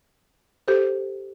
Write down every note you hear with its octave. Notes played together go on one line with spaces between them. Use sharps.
G4 A4 C5